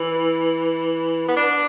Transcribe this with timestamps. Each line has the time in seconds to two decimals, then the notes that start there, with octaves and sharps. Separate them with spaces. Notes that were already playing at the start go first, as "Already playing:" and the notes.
Already playing: E3
1.28 B3
1.36 D4